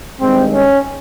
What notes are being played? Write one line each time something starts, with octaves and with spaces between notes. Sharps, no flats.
G2 D#3 G#3 C4
C#4